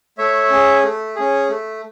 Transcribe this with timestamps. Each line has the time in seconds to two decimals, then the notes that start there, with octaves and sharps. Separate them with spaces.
0.18 A3 C#5 E5
0.51 C#4 G#4
0.83 A3
1.16 C#4 G#4
1.49 A3